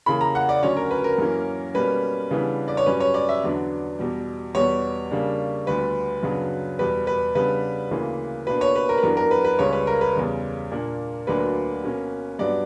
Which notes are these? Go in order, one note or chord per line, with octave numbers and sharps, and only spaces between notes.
C#3 E3 A#3 B5
A#5
F#5
D5
D2 D3 F#3 C#4 C#5
A#4
B4
A#4
F#2 E3 A#3 C#4
B2 G3 A#3 C#4 B4
C#3 E3 G3 B3 D4
D5
C#5
G2 F#3 C#4 B4
C#5
D5
E5
E2 D3 F#3 B3 D4
E2 B2 G3
E2 B2 G3 B3 C#5
C#3 G3 A#3 D4
D2 D3 G3 B3 B4
F#2 C#3 F#3 B3 D4
E2 B2 G3 B4
B4
C#3 G3 B3 D4 B4
D2 C#3 E3 A#3
B2 A#3 D4 B4
C#5
B4
A#4
B4
F#2 E3 B3 D4 A#4
A#4
B4
B4
C#2 C#3 G3 C#5
B4
A#4
B4
E2 C#3 G3
A#2 A#3 D4
D2 D3 F#3 A#3 D4 B4
B2 A#3 C#4
G2 F#3 B3 D4 D5